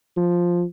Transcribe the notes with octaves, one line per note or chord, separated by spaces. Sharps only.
F3